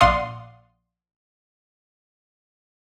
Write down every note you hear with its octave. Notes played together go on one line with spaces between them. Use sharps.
A#1 D5 F5 F#5 C6 D#6